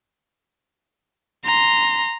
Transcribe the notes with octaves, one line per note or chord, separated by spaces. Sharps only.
A#5 C6